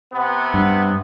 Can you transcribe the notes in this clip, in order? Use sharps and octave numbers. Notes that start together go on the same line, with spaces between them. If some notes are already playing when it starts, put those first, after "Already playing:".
C3 B3
G2